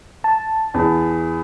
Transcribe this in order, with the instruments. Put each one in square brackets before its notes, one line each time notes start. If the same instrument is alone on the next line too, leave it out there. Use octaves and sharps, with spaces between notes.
[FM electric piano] A5
[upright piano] E2